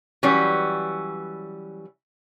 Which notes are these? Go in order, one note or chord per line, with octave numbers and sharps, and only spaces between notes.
E3 F#3 G3 C#4